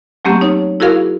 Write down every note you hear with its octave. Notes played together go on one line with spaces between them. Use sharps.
F#3 A3 A#3 C4 C#4 G4
D#4 C#5
E4 F#4 G#4 A#4 F5